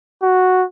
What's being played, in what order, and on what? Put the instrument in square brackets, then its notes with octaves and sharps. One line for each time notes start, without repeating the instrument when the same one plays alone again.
[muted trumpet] F#4